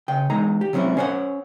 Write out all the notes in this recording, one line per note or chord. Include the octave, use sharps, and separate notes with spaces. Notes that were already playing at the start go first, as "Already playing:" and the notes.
C#3 G5
E2 G#3 D#4 A#5
G4
C3 F#3 C4 C#4 E4
C#4 C5 C#5 E5 F#5